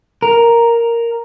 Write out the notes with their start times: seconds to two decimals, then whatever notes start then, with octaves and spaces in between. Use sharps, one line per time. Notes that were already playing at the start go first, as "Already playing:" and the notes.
0.22 A#4